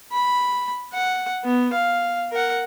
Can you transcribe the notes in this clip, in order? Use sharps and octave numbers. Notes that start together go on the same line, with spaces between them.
B5
F#5
B3
F5
A#4 F#5